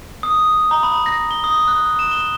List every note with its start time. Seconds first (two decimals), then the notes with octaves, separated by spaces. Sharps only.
0.23 D#6
0.71 A#5
0.83 B5
1.06 A#6
1.31 G7
1.44 D#6
1.68 F#6
1.99 E7
2.11 G7